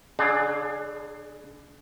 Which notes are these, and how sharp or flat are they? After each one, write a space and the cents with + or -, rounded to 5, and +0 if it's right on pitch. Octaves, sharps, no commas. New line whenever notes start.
D3 -45 D4 +30 G#4 +0